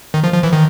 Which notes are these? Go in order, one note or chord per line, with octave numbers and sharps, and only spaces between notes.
D#3
F3
F3
E3
D#3